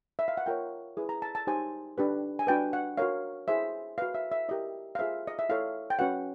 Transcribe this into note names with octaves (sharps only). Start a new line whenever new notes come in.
E5
F5
F#5
F4 A#4 C#5 G5
E4 G#4 B4
A#5
A5
A5
D#4 G4 C5 G#5
D4 G4 B4
G#5
D4 F#4 B4 G5
F#5
F#4 A#4 C#5 F5
E4 G#4 C5 E5
F#4 B4 F5
E5
E5
E4 G4 A#4 D#5
F5
F4 G#4 C5 E5
D#5
E5
E4 A4 C#5 F5
G5
C#4 F#4 B4 F#5